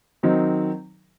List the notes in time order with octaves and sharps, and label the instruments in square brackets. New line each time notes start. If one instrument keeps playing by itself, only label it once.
[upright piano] D#3 F#3 C4 D#4